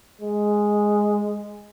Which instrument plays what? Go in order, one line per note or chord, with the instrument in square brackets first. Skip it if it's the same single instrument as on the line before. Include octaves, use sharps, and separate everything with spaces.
[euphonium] G#3